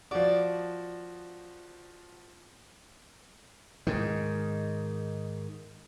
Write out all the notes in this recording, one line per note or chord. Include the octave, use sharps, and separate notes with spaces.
F3 F#4 D5
G#2 D#3